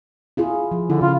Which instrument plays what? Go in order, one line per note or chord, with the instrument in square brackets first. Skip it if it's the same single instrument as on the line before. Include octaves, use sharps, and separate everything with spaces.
[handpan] E4 F4 G#4
F3
[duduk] D3 [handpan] E4
[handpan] C#3 [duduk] F4